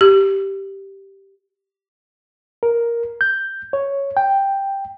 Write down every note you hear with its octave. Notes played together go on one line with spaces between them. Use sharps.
G4
A#4
G6
C#5
G5